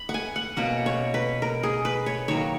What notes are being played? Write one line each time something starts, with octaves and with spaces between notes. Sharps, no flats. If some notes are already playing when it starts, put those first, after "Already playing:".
Already playing: B5
F#5
G#5
F#5
B2 A#3 C#4 F#5
C#5
B4
A#4
G#4
B4
C#5
D#3 F#3 A#3 C#5